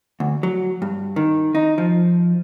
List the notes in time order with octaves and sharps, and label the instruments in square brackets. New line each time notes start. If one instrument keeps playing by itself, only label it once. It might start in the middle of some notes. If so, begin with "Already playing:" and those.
[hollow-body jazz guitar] D2
F#3
G2
D#3
D#4
F3